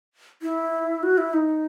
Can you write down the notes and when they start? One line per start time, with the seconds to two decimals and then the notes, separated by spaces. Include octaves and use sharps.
0.42 E4
1.03 F#4
1.18 E4
1.33 D#4